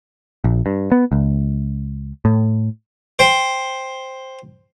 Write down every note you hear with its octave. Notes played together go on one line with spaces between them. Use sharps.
A#1
G2
B3
C#2
A2
C5 G5